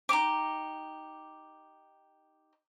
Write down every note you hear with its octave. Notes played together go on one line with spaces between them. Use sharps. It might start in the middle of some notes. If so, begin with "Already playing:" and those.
D#4 E4 G4 D6